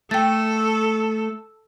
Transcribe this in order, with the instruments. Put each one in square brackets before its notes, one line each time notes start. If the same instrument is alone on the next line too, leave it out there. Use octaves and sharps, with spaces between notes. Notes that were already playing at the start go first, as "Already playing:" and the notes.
[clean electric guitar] A3 [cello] A4 [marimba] G5 A6